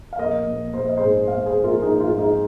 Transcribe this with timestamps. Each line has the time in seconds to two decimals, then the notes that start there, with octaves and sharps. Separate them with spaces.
0.13 F5
0.18 A#1 A#4 D#5
0.46 A#1
0.73 A#1 C5
0.86 D#5
0.97 G#2 G#4 C5
1.28 G#2 C5 F5
1.46 G#4 C5
1.55 A#1
1.64 F4 A#4
1.82 A#1 D#4 G#4
2.00 F4
2.10 G#2
2.18 D#4 G#4